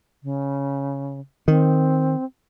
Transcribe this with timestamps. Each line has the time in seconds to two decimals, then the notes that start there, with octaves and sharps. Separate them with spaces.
0.23 C#3
1.48 D#3 C4